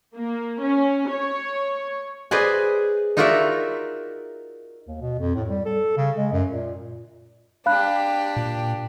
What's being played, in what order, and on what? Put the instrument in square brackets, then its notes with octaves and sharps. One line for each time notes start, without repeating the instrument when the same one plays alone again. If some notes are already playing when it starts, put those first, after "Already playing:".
[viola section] A#3
C#4
C#5
[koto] G#4 B4 C5 D5 D#5 G#5
D#4 F4 F#4 A#4 D5 E5
[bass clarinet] D#2
B2
F2
A2
G3
A4
C#3
G#3
F#2
A#2
[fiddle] D4 G4 [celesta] F5 B5 F#6
[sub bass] A#2